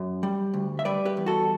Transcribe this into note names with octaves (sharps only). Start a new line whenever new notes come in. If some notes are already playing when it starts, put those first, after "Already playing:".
Already playing: F#2
G3
D2
E5
G3 B4 D5
G4 B4
E2
F#4 A4